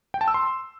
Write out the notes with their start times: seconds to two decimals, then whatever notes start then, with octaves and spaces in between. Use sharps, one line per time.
0.14 G5
0.21 A5
0.28 E6
0.34 C6